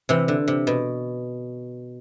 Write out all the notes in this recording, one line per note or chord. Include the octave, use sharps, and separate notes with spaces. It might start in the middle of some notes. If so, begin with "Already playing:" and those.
C3 E3
D3
C3
B2